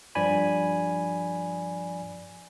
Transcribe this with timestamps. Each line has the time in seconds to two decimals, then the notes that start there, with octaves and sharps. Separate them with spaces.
0.15 G2 F3 D5 G#5 B5